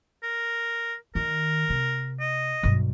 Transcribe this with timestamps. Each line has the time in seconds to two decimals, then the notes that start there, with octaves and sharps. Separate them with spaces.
0.23 A#4
1.15 D#3 A#4
1.70 C3
2.20 D#5
2.63 B1 G2